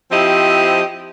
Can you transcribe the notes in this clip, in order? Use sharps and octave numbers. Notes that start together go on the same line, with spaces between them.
F3 C4 E4 G4 D#5